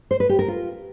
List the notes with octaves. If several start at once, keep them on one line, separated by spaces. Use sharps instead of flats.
C5
B4
G4
A#4
F4